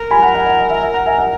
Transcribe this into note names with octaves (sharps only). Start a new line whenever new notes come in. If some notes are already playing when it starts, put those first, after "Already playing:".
Already playing: A#4
G#5 B5
F#5 A#5
D#5 F#5
D#5 F#5
D#5
E5
E5
F#5 A#5
E5 G#5
D#5 F#5